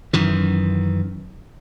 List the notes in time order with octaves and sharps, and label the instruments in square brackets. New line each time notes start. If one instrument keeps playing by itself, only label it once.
[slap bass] F#2 D#3 E3